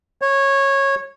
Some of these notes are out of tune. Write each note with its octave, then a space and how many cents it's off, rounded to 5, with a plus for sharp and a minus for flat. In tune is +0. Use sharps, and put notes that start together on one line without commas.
C#5 -15